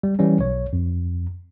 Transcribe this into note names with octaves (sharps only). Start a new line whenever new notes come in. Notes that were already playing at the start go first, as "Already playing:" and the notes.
G3
E3 G3 C#4
B1 C#5
F2